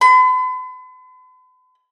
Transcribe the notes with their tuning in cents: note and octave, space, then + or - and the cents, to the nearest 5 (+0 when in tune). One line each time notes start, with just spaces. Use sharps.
B5 +45